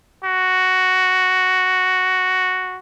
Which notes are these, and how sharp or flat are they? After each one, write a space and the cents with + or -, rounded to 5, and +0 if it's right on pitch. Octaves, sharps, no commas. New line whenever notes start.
F#4 +5